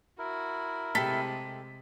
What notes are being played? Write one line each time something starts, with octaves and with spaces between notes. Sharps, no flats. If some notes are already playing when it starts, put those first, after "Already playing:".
E4 F#4 A#4
C3 G#3 G4 A4 B6